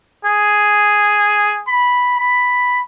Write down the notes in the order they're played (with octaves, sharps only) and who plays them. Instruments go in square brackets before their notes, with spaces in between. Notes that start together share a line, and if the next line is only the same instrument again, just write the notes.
[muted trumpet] G#4
B5
B5